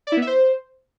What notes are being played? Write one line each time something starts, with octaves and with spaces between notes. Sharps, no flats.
D5
E4
B3
E5
C5